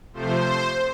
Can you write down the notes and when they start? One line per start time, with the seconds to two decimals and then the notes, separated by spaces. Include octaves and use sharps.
0.13 C3 F3 A3 C5